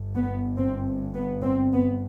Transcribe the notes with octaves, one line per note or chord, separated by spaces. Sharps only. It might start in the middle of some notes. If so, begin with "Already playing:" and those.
Already playing: G1 G2
B3
C4
B3
C4
B3